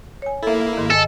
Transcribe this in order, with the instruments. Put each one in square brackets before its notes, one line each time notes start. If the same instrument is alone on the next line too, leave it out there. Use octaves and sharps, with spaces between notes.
[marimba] C#5 G#5
[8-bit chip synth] A#3 E4 [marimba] A4 E5
[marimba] G#2 D#3
[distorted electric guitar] A4 [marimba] D#5 G#5